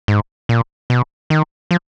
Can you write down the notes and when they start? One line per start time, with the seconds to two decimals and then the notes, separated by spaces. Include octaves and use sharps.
0.08 G#2
0.49 A#2
0.90 B2
1.30 D#3
1.71 F3